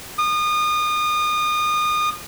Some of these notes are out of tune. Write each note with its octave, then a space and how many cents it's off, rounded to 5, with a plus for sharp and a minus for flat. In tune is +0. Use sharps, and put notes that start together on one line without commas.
D#6 -30